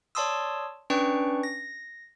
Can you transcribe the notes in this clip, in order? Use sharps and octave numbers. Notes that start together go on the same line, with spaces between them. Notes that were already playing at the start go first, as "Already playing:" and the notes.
C#5 D5 A5 C6 D#6 E6
C#4 D4 B4 D5 G5 C#6
A#6